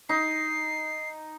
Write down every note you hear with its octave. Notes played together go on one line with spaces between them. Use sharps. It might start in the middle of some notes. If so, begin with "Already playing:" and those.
D#4 C7